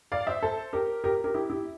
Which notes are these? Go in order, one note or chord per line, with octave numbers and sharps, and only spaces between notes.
D5 F5
C5 E5
A4 C5
G4 A#4
G4 A#4
G4 A#4
E4 G4
E4 G4